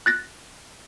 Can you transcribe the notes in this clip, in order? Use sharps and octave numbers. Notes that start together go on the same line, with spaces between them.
F#6 A6 A#6